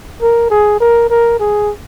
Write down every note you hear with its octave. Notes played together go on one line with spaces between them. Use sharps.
A#4
G#4
A#4
A#4
G#4